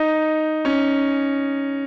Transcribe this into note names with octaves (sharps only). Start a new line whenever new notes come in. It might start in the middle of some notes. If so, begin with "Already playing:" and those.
Already playing: D#4
C#4